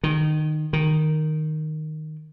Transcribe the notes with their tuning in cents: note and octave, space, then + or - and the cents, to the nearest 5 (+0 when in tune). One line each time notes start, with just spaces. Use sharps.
D#3 -20
D#3 -5